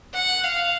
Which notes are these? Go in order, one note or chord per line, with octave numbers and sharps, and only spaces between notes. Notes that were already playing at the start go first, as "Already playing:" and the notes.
F#5
F5